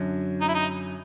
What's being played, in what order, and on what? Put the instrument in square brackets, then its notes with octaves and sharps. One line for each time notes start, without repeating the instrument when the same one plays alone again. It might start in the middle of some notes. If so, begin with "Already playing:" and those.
Already playing: [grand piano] F#2 D3 F#3
[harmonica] D#4
E4
D#4